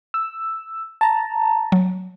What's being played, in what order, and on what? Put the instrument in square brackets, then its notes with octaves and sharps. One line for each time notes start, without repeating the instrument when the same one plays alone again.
[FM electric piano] E6
A5 A#5
[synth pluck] F#3